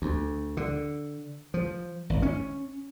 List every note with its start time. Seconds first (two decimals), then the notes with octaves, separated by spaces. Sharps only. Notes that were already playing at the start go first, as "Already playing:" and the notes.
0.02 D2
0.57 D3
1.54 F3
2.10 G#1
2.22 C#4